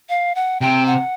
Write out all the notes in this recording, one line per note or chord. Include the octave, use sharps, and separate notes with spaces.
F5
F#5
C3 G5
F#5